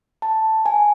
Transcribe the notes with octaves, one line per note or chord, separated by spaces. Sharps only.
A5
G#5